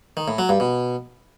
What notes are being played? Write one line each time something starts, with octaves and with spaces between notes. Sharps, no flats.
D#3
A2
F#3
G2
B2